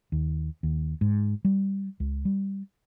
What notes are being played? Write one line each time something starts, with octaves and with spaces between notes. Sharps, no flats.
D#2
D#2
G#2
G3
C#2
G3